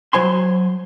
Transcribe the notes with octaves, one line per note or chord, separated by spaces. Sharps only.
F#3 C5 G#5 C6